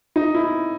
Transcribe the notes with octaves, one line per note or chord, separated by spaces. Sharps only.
D#4
E4